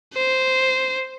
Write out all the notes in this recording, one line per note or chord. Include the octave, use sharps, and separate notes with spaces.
C5